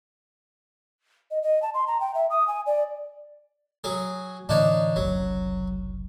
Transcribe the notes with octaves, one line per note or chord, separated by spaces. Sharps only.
D#5
D#5
A5
C6
A#5
G5
E5
D#6
G#5
D5
F#3 G#4
A2 D3 E3 D4 D#4 C#5
F#1 C2 F#2 F#3